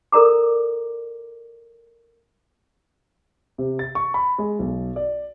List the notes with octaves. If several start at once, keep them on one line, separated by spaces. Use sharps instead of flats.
A4 A#4 D5 A#5 D6
C3
A6
C#6
B5
G#3
B1
D5